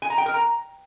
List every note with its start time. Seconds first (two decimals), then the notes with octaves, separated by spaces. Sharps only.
0.02 G#5
0.10 A#5
0.18 G5
0.26 A#4
0.34 A#5